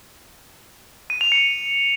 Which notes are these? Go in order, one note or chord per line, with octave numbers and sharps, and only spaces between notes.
D#7
F7
C#7